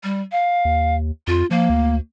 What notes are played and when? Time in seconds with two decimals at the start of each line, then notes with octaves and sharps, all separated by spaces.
0.03 G3
0.32 F5
0.65 D#2
1.27 F2 F4
1.51 F3 A#3
1.69 D2